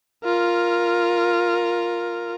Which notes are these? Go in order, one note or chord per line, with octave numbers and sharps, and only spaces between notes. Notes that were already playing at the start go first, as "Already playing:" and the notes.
F4 A#4